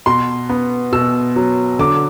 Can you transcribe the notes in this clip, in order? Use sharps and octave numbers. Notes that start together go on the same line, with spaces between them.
B2 C6
B3
B2 E6
F#3
D3 D6